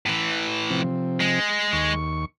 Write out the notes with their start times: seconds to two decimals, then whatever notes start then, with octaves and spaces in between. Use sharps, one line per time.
0.06 A2 E3
0.70 C3 F3 C4
1.20 G#3
1.73 D#2 C#6